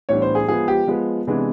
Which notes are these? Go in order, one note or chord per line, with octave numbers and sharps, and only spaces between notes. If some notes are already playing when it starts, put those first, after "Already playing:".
A2 E3 G3 B3 D4 C#5
C5
G#4
F3 G#3 B3 G#4
G4
F3 G#3 B3
C3 E3 G#3 B3 D4